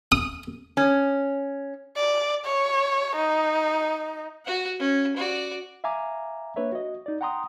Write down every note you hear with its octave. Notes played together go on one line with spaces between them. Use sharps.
D#6
C#4
D5
C#5
D#4
F#4 F#5
C#4
F#4 D5
E5 F5 G#5 A#5 D6
A#3 D4 B4 C#5 E5
F#4 D#5
D#4 D5
F#5 G5 A#5 C6 D#6